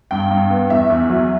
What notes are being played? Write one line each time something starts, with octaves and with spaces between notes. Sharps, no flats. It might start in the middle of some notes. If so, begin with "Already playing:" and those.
G2 G5
G2
B3
E2 E5
E2
F#3